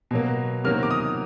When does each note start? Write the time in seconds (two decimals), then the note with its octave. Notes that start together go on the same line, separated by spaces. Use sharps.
0.11 B2 F#3 A#3
0.64 C3 D#3 F#3 A#3 F6
0.83 D6
0.91 D#6